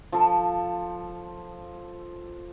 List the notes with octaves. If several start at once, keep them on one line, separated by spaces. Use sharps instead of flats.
F3 A4